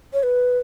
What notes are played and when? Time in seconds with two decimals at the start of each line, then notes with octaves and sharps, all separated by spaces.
0.13 C#5
0.23 B4